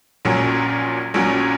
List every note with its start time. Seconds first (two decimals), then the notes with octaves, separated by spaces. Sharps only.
0.25 A#1 A#2 F#3 C#4
1.14 A#1 A#2 F#3 C#4